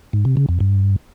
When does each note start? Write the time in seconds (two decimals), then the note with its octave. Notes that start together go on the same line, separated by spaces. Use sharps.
0.13 G#2
0.25 C3
0.37 C#3
0.49 F2
0.60 G2